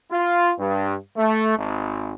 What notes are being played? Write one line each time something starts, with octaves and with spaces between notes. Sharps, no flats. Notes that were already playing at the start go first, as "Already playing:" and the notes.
F4
G2
A3
G#1